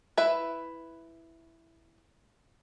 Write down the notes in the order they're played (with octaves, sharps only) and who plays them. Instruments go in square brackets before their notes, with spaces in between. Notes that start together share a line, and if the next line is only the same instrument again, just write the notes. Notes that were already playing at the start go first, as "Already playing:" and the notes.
[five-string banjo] E4 B4 E5